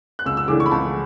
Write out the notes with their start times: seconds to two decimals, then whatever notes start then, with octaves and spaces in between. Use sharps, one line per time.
0.19 F#6
0.25 C#2 E6
0.37 E6
0.48 C#3 E3 A3 D4 D6
0.60 C#6
0.66 B5
0.72 C#2 A5